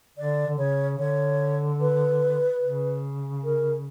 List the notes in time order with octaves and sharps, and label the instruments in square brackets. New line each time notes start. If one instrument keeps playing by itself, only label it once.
[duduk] D3 [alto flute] D5
[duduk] D3
[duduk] C#3 [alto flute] C#5
[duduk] D3 [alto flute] C#5
[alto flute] B4
[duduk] C#3
[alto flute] A#4